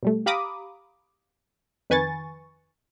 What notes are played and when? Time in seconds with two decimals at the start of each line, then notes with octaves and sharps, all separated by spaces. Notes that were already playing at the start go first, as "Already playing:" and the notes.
0.03 B2 G3 A3
0.26 G4 F5 A#5 B5 D6 D#6
1.90 F2 D#3 B4 G#5 C#6 A6